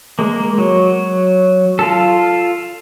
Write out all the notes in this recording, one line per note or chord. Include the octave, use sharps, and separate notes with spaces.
G#3 A#3
F#3
F4 A4